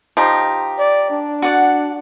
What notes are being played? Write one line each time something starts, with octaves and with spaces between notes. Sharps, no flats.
F3 D#4 G4
D5
D4
F#4 D5 F#5